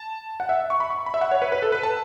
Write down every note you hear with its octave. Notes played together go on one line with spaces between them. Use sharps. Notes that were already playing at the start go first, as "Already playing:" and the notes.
Already playing: A5
F#5
E5
C#6
B5
C#6
B5
E5
F#5
C#5
B4
B4
A4
B4
A5